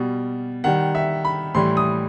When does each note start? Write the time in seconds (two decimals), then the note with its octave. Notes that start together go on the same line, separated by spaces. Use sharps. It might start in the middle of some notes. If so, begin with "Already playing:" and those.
Already playing: B2 G3
0.64 D#3 G3 F#5
0.95 E5
1.25 B5
1.55 A2 E3 G3 C6
1.77 D#6